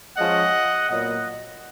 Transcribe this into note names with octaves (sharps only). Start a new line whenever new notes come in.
F3 G#3 C#4 D#5 F#5
A#2 F#3 B3 D#5 F#5